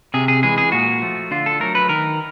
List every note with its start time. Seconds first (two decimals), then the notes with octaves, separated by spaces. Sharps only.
0.14 C3 G#4
0.28 G#4
0.43 E3 G#3 G#4
0.58 G#4
0.72 A#2 F#4
1.02 F3 A3
1.31 D3 F4
1.46 A4
1.60 F#3 A3 A#4
1.75 B4
1.89 D#3 A#4